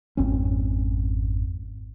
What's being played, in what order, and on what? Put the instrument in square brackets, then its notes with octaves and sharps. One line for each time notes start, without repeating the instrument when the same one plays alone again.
[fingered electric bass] G#1 F2 C4 C#4